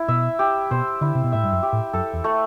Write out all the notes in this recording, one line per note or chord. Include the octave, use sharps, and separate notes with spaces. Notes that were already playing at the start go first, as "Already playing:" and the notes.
Already playing: E4
B2 E5
G4
B2 C5
D3 E4
C3
B2
A2 E5
G2
F#2
G4
A2
F#2 A4
E2
A3